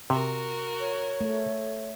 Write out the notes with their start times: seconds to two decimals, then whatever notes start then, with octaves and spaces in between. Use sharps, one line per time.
0.10 C3 F#4 A#4
0.80 C#5
1.21 A3